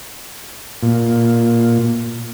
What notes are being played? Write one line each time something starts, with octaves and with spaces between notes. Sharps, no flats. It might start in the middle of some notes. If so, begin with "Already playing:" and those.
A#2